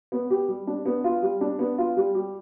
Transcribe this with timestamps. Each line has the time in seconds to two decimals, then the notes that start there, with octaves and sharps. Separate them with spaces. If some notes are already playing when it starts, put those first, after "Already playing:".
0.12 B3
0.30 G4
0.48 G3
0.67 D4
0.86 B3
1.04 F4
1.22 G3
1.41 D4
1.59 B3
1.78 F4
1.97 G3
2.15 G4